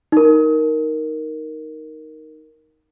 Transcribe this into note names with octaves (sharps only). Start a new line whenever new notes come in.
D#4 A#4